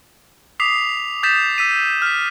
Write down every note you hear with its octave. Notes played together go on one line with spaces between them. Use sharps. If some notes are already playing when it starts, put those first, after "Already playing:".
D6 D#6 B6 C7 F7
D#6 G6 A6 B6 E7
E6 B6 D#7
F6 B6